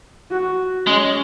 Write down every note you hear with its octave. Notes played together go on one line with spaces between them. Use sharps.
F#4
G#3 C#4